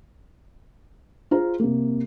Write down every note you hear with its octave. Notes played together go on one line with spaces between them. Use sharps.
F4 G#4 C5 A#5
C3 A#3